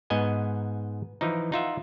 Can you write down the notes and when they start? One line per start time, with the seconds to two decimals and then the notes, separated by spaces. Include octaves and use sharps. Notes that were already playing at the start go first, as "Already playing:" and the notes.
0.10 G#2 B3 D#5 G#5
1.21 E3 F3 D#4
1.52 D#4 F4 E5 F#5